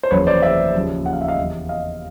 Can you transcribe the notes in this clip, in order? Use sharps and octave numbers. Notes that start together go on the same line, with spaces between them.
C5
F#1 E2 C#3 F3 B4 C#5
C5 D5
D5 E5
D#2 C#3 F3
F#5
F5
E5
D#5 F5
E2 C3 E3
D#5 F5